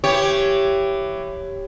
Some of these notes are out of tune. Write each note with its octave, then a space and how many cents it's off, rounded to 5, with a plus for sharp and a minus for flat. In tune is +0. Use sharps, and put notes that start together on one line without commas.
E3 +20 G4 +0 C#5 +0